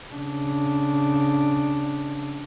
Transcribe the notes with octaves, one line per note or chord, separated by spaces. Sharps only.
C#3 D4